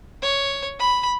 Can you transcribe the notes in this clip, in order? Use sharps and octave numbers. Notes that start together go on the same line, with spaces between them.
C#5
B5